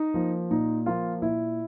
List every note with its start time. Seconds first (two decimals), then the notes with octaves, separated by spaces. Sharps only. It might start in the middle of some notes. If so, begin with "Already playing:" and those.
Already playing: D#4
0.14 F3 A#3
0.51 A#2 D#4
0.86 F3 A#3 F4
1.22 A#2 E4